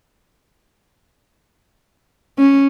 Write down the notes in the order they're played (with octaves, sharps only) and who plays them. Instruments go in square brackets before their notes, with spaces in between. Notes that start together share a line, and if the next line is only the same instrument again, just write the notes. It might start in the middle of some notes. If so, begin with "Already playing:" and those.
[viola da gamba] C#4